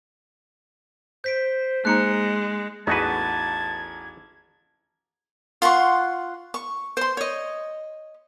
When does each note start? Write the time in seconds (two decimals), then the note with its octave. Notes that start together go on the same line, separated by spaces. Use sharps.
1.24 C5 G6 B6 D7
1.85 G#3 A#3 D#4 A#5 F#6 C#7
2.87 A1 E2 D#4 F#4 B4 A5 G#6
5.62 F4 F#5 C6 C#6
6.54 C#6
6.97 C5 C6
7.17 C#5 D#5